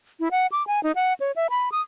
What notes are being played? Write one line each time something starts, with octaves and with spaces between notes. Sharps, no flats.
E4
F#5
D6
G#5
D#4
F#5
C#5
E5
B5
D#6